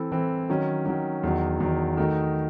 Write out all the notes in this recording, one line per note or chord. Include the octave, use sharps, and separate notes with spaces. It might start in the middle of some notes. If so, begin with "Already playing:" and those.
Already playing: E3 C4 E4 A4
E3 C4 E4 A4
D#3 F#3 C#4
D#3 F#3 C#4
E2 D#3 F#3
E2 D#3 F#3
D#3 A3 D#4 F#4